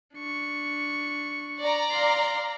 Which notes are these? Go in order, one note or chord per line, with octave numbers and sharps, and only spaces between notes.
D4 C#6
D5 A#5
F5 C6